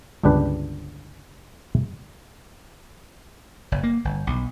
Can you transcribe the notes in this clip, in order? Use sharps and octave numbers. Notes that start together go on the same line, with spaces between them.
G1 C#2 D4 G4 B4
F#1
A#3
G1
B1